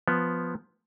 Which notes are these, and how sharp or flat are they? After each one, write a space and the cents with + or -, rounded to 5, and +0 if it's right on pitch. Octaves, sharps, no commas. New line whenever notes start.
F3 +0 B3 +0